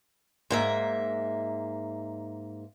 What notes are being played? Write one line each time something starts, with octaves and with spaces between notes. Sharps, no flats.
G#2 A#3 E5